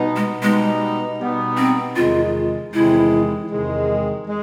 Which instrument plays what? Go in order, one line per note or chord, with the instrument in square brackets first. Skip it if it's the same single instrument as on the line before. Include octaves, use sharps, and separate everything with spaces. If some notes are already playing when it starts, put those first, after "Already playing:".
Already playing: [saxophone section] B2 G3 B3 D#4
[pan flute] G#3
[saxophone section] B2 G3 B3 D#4 [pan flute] G#3
[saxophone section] B2 G3 B3 D#4
[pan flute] C4
[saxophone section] E2 C3 D#3 G#3 [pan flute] F4
[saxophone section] E2 C3 D#3 G#3 [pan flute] E4
[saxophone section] E2 C3 D#3 G#3
G#3